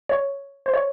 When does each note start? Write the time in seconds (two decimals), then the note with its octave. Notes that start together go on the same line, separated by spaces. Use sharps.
0.09 C#5
0.66 C5
0.74 C#5